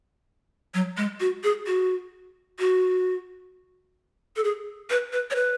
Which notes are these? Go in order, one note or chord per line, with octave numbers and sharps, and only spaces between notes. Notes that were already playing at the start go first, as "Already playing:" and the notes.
F#3
G#3
F#4
G#4
F#4
F#4
A4
G#4
B4
B4
C#5
B4